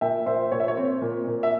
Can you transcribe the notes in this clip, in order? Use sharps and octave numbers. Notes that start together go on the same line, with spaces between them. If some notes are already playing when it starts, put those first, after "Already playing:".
A#2 E5 G5
A#2 C5 E5
A#2 C#5
E5
C#5
C4
A#2
A#2
E5